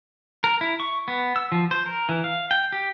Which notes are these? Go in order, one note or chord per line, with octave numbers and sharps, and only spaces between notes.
A#4
E4
C#6
B3
E6
F3
C5
A#4
E3
F5
G5
G4